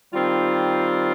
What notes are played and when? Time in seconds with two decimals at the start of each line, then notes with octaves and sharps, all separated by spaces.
0.13 D#3 G3 C4 F4